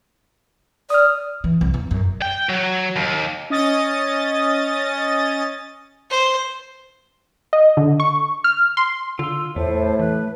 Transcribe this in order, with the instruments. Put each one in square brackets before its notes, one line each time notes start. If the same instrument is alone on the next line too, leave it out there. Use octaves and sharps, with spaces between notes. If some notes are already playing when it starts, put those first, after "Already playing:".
[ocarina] D5 [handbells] D#6 F6
[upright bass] E3
C2
E2
F#2
[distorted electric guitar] G5
F#3
D#2
[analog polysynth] C#4 D#5 D#6 A6
[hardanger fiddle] C5
[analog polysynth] D#5
D3
C#6
F6
C6
[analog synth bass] D3 [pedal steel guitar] F4 C6 [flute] E6
[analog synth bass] E2 [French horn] A2 [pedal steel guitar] A3 [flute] C5
[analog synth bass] E3 [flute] B4